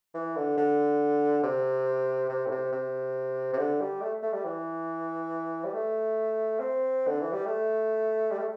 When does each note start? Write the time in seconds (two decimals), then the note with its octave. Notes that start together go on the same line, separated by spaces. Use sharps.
0.14 E3
0.37 D3
0.57 D3
1.43 C3
2.29 C3
2.46 A2
2.51 C3
2.72 C3
3.53 C3
3.58 D3
3.81 G3
4.01 A3
4.23 A3
4.33 G3
4.45 E3
5.64 G3
5.74 A3
6.60 C4
7.08 D3
7.21 E3
7.32 G3
7.46 A3
8.31 G3
8.39 A3